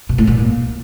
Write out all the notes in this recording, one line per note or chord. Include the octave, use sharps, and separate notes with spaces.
B2
A2
A#2